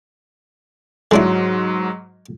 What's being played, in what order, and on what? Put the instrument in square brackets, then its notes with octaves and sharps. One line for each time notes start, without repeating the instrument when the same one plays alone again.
[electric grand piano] G#2 F#3 C6 [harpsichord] G#3 D4 E4